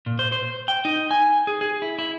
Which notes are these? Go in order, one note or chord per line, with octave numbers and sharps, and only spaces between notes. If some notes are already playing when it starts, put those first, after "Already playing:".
A#2
C5
C5
G5
D#4
G#5
G#4
G#4
E4
E4